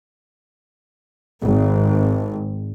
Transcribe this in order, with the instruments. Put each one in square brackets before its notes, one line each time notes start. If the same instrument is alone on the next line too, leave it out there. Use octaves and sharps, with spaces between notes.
[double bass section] G#1